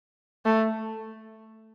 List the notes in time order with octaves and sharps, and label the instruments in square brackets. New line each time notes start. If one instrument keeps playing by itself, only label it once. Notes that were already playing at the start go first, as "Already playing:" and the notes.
[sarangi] A3